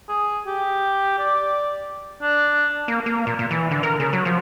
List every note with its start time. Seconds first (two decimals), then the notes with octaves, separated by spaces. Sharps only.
0.09 G#4
0.46 G4
1.18 D5
2.22 D4
2.88 A#3
3.06 A#3
3.27 A#2
3.39 A#2
3.51 E3
3.71 D3
3.83 A#4
4.00 C#3
4.13 F#3
4.25 F3